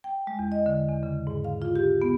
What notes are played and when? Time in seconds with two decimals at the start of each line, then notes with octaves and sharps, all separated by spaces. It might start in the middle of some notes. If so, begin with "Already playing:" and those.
0.04 G5
0.27 G#3
0.39 E2
0.52 D#5
0.66 D3
0.89 E2
1.03 C#3
1.27 G#2
1.45 F5
1.62 F4
1.76 G4
2.02 B3